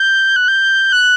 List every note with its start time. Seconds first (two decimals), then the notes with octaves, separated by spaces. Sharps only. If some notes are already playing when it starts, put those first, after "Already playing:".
Already playing: G6
0.36 F#6
0.48 G6
0.92 F#6